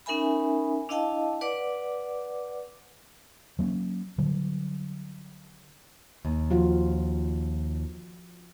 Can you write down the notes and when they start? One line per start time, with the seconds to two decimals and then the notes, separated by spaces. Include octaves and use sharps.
0.06 C#4 D#4 A#4 E5 G#5 B5
0.89 D4 E4 D#5 F5 G5 A5
1.41 B4 D5 F#5 D6
3.59 F#3 A#3 B3 C#4
4.18 D3 F#3 G3
6.25 D#2
6.51 F3 F4 F#4